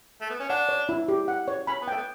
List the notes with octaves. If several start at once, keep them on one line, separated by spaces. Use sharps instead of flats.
A3
B3
C#4
D4 F#5
C#5
E4
G4
F#5
C#5
C#4 B5
B3
A3 G5
B3